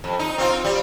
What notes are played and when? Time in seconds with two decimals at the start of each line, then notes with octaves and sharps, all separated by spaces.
0.04 F2
0.19 D#4
0.38 C4 F4
0.65 G3